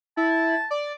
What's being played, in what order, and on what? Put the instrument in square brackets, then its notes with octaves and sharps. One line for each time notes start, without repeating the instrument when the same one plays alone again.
[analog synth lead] E4 [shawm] A5
[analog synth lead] D5